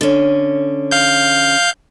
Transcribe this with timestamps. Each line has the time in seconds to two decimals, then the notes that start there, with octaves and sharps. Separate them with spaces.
0.01 D3 C#4
0.91 F5 G6